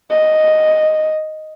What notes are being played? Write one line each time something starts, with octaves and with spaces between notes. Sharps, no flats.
D#5